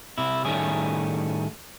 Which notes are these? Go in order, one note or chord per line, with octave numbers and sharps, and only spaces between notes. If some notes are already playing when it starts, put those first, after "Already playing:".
C3 E4
A2 D#3 G3 A3 C#4 G#4